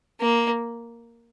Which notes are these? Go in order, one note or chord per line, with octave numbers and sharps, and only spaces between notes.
A#3